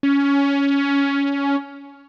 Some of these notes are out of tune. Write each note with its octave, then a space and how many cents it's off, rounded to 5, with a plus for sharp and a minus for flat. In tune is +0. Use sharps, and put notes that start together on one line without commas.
C#4 +15